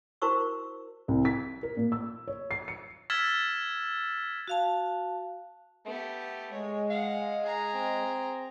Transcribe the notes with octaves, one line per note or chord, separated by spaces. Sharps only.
E4 F#4 A#4 C5 C#6 E6
C2
B6
A#4
A#2
E6
C#5
C7
C#7
E6 F6 G#6 A6 B6 E7
F#4 F5 A5
A3 B3 G4
G#3 C#5
F5 F#5
G#4 A#5
C4